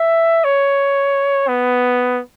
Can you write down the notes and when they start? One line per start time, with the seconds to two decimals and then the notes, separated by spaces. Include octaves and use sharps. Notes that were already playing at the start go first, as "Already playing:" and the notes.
Already playing: E5
0.44 C#5
1.48 B3